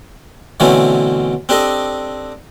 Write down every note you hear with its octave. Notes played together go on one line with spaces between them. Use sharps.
B2 D3 E3 A3 C4 C#4
C4 D4 G4 A4 D#5